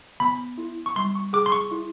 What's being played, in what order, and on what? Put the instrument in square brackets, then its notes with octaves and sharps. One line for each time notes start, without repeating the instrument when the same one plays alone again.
[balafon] B3 [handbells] B5
[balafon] E4
[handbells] C#6
[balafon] G3 [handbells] C6
[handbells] C#6
[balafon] G#4 [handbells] D6
[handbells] C6
C#6
[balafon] E4